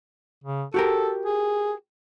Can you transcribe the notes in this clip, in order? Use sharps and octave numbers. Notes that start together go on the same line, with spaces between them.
C#3
F#4 G4 A4 A#4
G#4